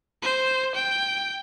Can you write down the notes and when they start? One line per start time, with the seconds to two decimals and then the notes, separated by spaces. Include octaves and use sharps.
0.22 C5
0.75 G5